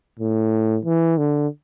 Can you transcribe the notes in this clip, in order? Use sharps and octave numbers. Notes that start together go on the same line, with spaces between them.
A2
E3
D3